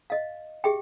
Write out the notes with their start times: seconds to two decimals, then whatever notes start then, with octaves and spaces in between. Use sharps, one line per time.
0.10 D#5 F5
0.64 G4 G#4 E5 G5